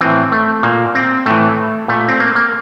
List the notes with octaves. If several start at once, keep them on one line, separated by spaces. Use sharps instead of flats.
A2 E3 C4
A3
A#2 A#3
C4
A2 E3 A3
A#2 A3
C4
A#3
A#3